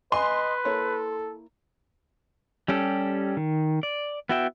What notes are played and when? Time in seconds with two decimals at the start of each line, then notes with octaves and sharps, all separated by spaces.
0.12 B4 D#5 G#5 C6
0.65 A#3 E4 A4 C#5
2.68 G3 C#4 G4 A4
3.37 D#3
3.83 D5
4.29 B3 E4 F#4 E5 G5